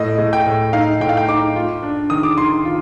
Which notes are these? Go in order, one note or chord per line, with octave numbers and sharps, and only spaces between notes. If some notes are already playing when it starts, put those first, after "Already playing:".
Already playing: A2 D#5
A2
G5
A2
D#4 F5
A2 G5
F5
G5
D#4 D6
F4
D4
D#3 D#6
D6
D#3 C6
F4